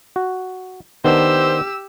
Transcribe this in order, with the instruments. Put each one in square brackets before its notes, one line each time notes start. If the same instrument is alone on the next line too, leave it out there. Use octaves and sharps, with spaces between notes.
[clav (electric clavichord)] F#4
[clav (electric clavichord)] D#3 B3 D4 [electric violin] G4 E6 [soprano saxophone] C5